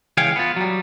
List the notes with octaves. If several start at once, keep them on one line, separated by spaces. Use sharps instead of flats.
C#2 E3 G#4 C#5 F5 G5
B3 F4
F#3 G3